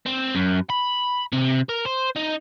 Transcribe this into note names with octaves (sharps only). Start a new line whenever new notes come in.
C4
F#2
B5
C3
A#4
C5
D#4